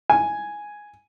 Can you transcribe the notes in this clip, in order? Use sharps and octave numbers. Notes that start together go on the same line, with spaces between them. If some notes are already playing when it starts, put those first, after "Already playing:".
G#5